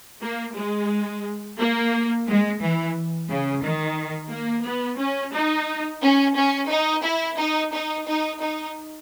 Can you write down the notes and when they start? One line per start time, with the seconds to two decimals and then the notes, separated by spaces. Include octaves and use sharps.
0.21 A#3
0.55 G#3
1.58 A#3
2.26 G#3
2.61 E3
3.28 C#3
3.63 D#3
4.31 A#3
4.65 B3
4.99 C#4
5.34 D#4
6.02 C#4
6.37 C#4
6.71 D#4
7.05 E4
7.39 D#4
7.74 D#4
8.07 D#4
8.42 D#4